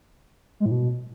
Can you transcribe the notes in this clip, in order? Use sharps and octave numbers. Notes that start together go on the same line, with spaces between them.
G#3
A2
B2